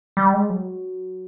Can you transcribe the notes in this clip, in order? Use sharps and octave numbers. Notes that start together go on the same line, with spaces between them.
G3
G#3
F#3